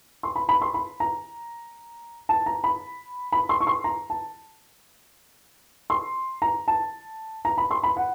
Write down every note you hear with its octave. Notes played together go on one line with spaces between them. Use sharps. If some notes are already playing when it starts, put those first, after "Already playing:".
C6
B5
B5
C6
B5
A#5
A5
A#5
B5
B5
C6
C#6
C6
A#5
A5
C6
A#5
A5
A#5
B5
C6
B5
F#5